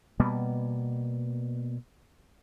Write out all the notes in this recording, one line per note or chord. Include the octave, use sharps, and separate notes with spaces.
B2 G3 A#3 B3